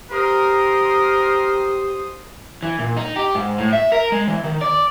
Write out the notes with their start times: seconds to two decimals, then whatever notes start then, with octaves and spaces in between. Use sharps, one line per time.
0.11 G4 A#4 C5 D#6
2.63 E3
2.79 A#2
2.97 D#4
3.16 G4
3.35 G#2
3.58 A2
3.73 E5
3.92 A#4
4.12 G#3
4.28 E3
4.44 D#3
4.61 D5